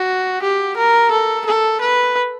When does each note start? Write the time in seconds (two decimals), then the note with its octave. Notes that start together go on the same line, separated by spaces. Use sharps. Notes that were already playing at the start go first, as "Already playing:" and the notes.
Already playing: F#4
0.42 G4
0.77 A#4
1.11 A4
1.46 A4
1.81 B4